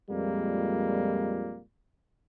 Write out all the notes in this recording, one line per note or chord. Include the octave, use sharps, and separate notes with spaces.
F2 A#2 G3 G#3 A#3